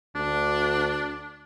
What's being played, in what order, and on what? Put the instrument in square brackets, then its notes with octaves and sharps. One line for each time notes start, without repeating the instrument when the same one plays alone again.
[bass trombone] D2 [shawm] D4